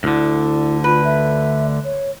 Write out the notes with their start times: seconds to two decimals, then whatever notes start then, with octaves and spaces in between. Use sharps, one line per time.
0.04 D2 D3 E4
0.84 F4 B4
1.04 E5
1.84 C#5